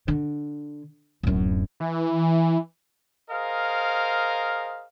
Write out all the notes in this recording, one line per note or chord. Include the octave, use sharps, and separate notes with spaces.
D3
D1 F#2
E3
G#4 A#4 C5 D#5 F5